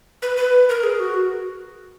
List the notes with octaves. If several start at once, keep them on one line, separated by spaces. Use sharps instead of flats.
B4
B4
A#4
G#4
F#4